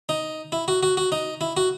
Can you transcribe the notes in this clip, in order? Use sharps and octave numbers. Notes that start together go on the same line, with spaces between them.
D#4
E4
F#4
F#4
F#4
D#4
E4
F#4